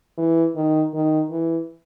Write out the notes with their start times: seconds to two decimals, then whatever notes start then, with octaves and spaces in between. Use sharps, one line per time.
0.18 E3
0.55 D#3
0.94 D#3
1.31 E3